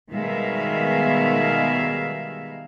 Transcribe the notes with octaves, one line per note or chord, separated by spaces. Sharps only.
B2 D#3 G3 G#3 E5 F5